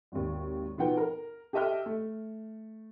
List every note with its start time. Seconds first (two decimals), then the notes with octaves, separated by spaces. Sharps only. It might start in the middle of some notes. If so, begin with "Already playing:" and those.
0.12 G#1 D#2
0.78 B2 F3 B3 D#4 F#5 G5
0.97 A#4
1.53 G4 A4 D#5 E5 G5 F6
1.86 A3